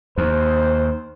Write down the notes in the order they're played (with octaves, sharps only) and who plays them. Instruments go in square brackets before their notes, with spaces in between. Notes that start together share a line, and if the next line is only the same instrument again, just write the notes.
[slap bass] D#2 [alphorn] C5